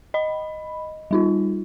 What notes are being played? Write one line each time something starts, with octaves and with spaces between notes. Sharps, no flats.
D#5 B5
G3 D#4 F4